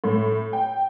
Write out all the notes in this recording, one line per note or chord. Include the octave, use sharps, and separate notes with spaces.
A2
G5